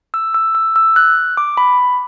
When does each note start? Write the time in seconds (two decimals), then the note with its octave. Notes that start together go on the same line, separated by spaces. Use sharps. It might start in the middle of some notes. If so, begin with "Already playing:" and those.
0.14 E6
0.34 E6
0.55 E6
0.76 E6
0.96 F#6
1.37 D6
1.57 B5